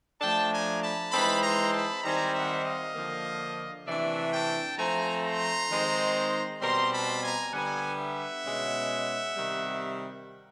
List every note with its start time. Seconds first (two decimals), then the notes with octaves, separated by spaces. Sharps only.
0.21 F3 A3 D4 G5 A5
0.51 G#5 A#5
0.81 A5 B5
1.12 E3 G#3 C4 D#4 A5 B5
1.43 A#5 C6
1.73 A5 B5
2.04 D#3 G3 C4 D#4 G#5 A#5
2.34 E5 F#5
2.64 D#5 F5
2.95 D3 F3 A#3
3.86 C3 E3 A3 D4 D5 E5
4.33 G5 A5
4.78 F3 A3 C4 G#5 A#5
5.24 A#5 C6
5.69 D#3 G#3 C4 D#4
6.61 B2 G3 C4 A#5 C6
6.91 A5 B5
7.22 G#5 A#5
7.52 D3 G3 B3 F#5 G#5
7.99 E5 F#5
8.45 B2 G#3 C#4
9.36 C3 D#3 G3